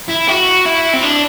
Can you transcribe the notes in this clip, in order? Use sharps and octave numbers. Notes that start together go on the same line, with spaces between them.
E4
F#4
E4
C4
D4